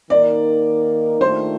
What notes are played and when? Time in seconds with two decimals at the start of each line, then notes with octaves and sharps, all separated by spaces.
0.10 D#3 A#3 D#4 A#4 D5
1.20 D#2 D#3 A3 D4 F4 C5